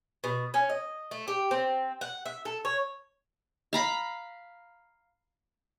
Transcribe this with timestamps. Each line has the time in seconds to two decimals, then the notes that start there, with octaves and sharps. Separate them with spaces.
0.24 B2
0.54 C#4
0.70 D#5
1.11 A3
1.28 G4
1.51 C4
2.01 F#5
2.26 E5
2.45 A4
2.65 C#5
3.73 F5 A#5 B5